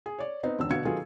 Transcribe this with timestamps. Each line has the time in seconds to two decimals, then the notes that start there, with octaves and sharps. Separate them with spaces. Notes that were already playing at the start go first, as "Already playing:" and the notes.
0.06 G#4
0.19 C#5 D5
0.43 B3 C4 D#4
0.59 E1 D3 E6
0.71 B2 D3 F5 G#6 C#7
0.85 D#3 F#3 B3 F4 G#4 A4